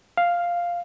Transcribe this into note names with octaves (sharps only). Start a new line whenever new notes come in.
F5